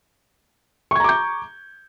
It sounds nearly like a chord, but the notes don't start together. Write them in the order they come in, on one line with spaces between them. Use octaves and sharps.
C#6 G#6 A#5 D6 G6